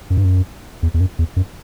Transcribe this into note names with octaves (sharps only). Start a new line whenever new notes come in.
F#2
G2
F#2
E2
E2
F#2
E2
F#2